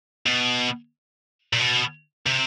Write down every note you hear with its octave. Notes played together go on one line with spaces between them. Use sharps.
B2
A#2
B2
C3